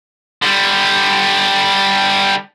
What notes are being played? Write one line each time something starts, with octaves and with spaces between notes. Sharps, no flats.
D3 G3